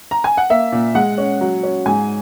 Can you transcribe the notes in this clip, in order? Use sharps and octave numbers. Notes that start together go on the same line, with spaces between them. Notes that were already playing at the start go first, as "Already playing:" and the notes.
A#5
G#5
F#5
A#3 E5
A#2
G#3 F#5
C#4
F#3
C#4
G#2 G#5